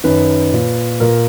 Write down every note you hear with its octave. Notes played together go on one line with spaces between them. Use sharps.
F#2 D#3 B4
A#2
A#2 A#4